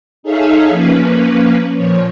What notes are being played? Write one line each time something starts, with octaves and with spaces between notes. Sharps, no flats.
D#4 G#4 A4 C#5 E5 F5
F3 A#3 C#4 B4
A#2 F3 C#5